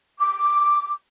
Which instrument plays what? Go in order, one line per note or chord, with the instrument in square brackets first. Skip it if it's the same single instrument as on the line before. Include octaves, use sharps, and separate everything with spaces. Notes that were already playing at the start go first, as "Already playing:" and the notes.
[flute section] D6